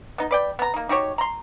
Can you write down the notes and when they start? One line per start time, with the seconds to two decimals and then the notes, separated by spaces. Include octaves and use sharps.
0.18 B3 D#4
0.31 B4 D5 G5
0.59 B3 A#5
0.74 A#3 D#4
0.89 D#4 F#4 G4 C#5
1.18 A#5 C6